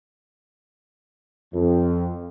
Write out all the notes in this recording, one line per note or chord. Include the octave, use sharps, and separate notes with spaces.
F2